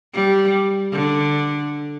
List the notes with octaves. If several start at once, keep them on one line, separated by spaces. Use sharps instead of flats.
G3
D3